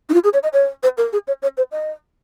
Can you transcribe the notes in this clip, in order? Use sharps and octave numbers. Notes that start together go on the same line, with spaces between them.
D#4
F4
G#4
C#5
D#5
C#5
C5
A#4
G#4
C#5
C#5
C5
D#5